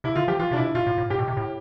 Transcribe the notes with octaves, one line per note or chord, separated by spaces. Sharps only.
C3 E4
D3 F4
F3 G4
E3 F4
C3 D4
B2 E4
C3
B2 F4
A2
A2
A2 G4
B2
C3
A2